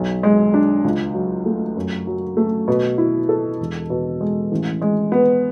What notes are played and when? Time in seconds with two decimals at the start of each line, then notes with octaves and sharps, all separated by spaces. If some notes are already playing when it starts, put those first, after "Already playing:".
Already playing: B1
0.23 G#3
0.54 D4
0.84 C#2
1.14 F#3
1.46 A3
1.76 F#2
2.07 F#3
2.37 A3
2.68 B2
2.98 E4
3.29 A4
3.60 E1
3.90 B2
4.21 G#3
4.52 A1
4.81 G#3
5.12 B3